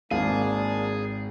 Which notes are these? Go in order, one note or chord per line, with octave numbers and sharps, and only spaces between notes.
G#1 A#3 D4 G#4 F5 A5